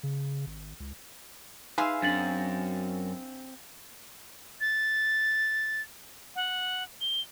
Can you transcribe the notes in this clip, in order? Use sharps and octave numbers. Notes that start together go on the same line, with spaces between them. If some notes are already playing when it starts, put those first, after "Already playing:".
C#3
G#1
C#2
D#4 G#4 B4 E5 F5 G#5 C6
F#2 C4 D4 A6 F#7
A6
F#5
G7